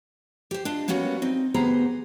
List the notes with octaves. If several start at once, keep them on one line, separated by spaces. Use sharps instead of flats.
G4 C5
D4 F4 D#5
G3 A#3 B3 C#4 F#4
C4 D#4
D2 B3 G4 G#4 C5 A#5